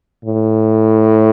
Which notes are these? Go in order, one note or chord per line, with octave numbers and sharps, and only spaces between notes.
A2